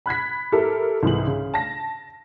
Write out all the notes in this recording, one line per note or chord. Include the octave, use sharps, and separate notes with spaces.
B5 F#6 G#6 B6
E4 G4 A4 A#4
C2 G#2 E3 F#7
C#3
A5 A#6